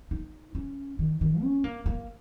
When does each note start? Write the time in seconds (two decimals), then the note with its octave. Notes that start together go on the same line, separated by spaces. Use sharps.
0.11 D#4
0.55 C#4
0.99 D#3
1.21 D#3
1.42 C#4
1.64 A#3
1.86 A#3